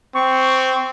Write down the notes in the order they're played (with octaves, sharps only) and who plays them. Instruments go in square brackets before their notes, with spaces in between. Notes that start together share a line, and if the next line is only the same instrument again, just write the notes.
[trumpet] C4 [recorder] C#6